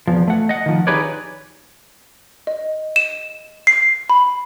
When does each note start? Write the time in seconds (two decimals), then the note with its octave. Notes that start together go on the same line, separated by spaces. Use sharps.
0.07 E2 F3
0.28 A3 F#5
0.49 D#5 F#5
0.66 D#3 F3
0.87 D#4 G4 G#4 B4 C#5 D5
2.47 D#5
2.96 E7
3.67 C7
4.10 B5